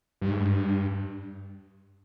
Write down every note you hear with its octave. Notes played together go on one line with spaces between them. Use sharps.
G2
G#2
G2